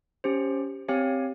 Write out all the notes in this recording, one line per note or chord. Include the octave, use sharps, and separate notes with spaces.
C#4 G4 C5
C4 G4 C#5 F5 G#5